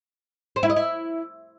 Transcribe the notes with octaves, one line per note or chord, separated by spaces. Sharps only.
C5
E4
D#5
E4